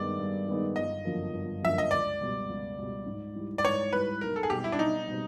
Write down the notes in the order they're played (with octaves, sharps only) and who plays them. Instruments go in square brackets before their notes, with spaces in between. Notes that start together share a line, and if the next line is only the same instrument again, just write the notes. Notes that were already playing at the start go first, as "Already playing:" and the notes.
Already playing: [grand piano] G2 D#3 G#3 B3 D#4 [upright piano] D5
[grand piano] G2
D#3 G#3 B3 D#4
[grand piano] G1 [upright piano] D#5
[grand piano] F#2 D3 F3 A#3
G1
[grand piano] F#2 D3 F3 A#3 [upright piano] E5
[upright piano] D#5
[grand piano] C#2 [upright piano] D5
[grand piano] B2 G3
C#2
B2 G3
G#2
E3 G3
[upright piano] D5
[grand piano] G#2 [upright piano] C#5
[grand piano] E3 G3 [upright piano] B4
[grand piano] B1 [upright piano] A#4
[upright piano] A4
G#4
[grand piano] B2 G3 C4 [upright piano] G4
[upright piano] E4
D4
[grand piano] B1 [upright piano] D#4
[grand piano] B2 G3 C4